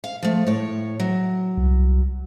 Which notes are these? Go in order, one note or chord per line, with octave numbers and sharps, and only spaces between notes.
F5
F3 A3
A2 C#5
F#3
C2